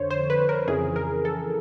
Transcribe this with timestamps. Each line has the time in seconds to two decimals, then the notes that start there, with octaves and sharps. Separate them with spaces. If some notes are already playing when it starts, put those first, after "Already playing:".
Already playing: F2 D3 C5 C#5
0.10 C5
0.30 B4
0.49 A#4
0.67 F2 C#3 E3 G#4
0.96 A#4
1.25 A4